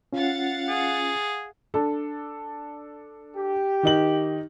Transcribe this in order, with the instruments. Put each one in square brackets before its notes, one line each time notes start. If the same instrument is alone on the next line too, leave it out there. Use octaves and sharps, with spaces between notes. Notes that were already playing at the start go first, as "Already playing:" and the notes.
[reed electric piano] C#4 F4 [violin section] F5 F#5 A6
[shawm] G#4
[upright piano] D4 A4
[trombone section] G4
[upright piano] D#3 D#4 F#7